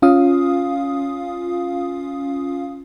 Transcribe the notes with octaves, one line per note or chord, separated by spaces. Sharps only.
C#4 F4 F5 D#6